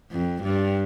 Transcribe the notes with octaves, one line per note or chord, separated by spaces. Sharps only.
F2
G2